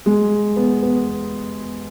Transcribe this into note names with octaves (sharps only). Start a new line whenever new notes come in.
G#3
B3
B3